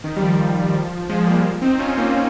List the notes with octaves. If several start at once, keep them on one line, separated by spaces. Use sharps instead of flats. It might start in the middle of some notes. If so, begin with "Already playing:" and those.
D#3
G3
F3
F3 G#3
G3 A#3
C4 D#4
C#4 F4
A#3 C#4